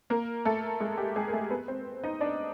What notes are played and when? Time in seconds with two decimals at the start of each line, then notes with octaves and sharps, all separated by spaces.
0.10 A#3 A#4
0.45 A3 A4
0.80 G#3 G#4
0.97 G4
1.16 G#3 G#4
1.28 A#4
1.32 A3 A4
1.50 B3 B4
1.68 C4 C5
2.04 D#4 D#5
2.21 D4 D5